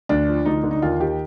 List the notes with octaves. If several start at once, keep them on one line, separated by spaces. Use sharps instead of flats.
D2 D4
F3
D2 D#4
D3
D#4
D#2 F4
D#3 G4